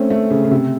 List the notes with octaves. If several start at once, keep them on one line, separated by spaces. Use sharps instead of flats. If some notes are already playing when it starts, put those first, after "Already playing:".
Already playing: A3 C4 C#4
A3
C#3
C#3
C3